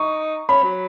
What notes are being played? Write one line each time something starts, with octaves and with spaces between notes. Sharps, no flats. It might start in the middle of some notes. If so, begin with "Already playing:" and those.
Already playing: D#4 C#6
C#4 B5
F#3